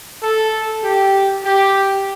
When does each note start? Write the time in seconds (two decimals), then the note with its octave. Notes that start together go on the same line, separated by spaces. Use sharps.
0.22 A4
0.84 G4
1.44 G4